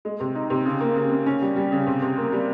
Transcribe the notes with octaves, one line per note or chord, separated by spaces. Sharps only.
G#3
C3
D#4
C3
C#3
A#3
C#3
C#3
C#4
G3
G3
C#3
C3
C3
A#3
G3